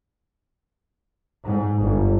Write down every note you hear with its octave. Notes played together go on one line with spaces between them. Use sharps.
G#2
G1